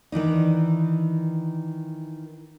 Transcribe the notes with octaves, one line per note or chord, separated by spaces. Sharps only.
D#3 E3 D4 D#4